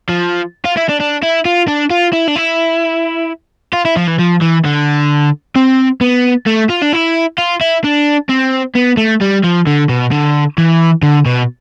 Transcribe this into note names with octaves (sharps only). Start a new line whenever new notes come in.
F3
F4
E4
D4
D4
E4
F4
D4
F4
E4
D4
E4
F4
E4
F3
E3
F3
E3
D3
C4
B3
A3
F4
D4
E4
F4
E4
D4
C4
B3
A3
G3
F3
D3
B2
D3
E3
D3
B2